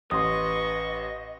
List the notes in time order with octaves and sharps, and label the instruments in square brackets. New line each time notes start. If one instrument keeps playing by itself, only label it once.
[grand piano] A1 C6 [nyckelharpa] B4 C#6 [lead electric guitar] D#5 [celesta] D#6